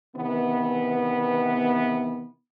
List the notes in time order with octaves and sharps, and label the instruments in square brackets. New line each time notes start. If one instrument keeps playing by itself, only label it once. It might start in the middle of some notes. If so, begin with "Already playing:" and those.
[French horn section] C3 D#3 E3 B3